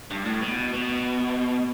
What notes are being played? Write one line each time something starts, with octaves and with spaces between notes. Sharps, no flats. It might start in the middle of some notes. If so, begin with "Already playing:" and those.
G2
A2
B2
B2